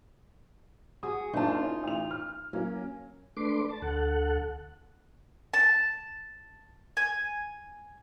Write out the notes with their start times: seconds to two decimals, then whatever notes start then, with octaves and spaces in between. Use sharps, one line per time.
1.03 F#4 G#4 D#6
1.33 F#1 D4 D#4 F4 A5
1.62 C#4 E4
1.83 A1 F7
2.11 F6
2.53 F#3 A#3 C#4
3.37 A3 D4 B4 C6 D6
3.69 A5
3.82 D2 A4 F#5
5.54 A5
6.97 G#5